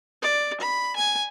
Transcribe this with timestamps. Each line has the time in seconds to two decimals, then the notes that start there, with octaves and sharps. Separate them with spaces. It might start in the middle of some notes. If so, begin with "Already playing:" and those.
0.22 D5
0.60 B5
0.96 G#5